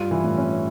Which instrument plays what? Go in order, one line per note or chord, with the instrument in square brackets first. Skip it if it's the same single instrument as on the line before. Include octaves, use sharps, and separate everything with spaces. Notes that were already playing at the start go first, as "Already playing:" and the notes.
Already playing: [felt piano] G2 G3 [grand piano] F4
[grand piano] E3
[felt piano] A2 A3
[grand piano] C#4